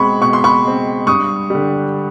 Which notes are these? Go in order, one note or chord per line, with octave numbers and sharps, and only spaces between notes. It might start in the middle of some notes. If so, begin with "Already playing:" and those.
Already playing: B2 G#3 C4 B5 C#6
B2 C#6
C6
B5 C#6
G#3 C4
G2 C#6 D#6
D3 G3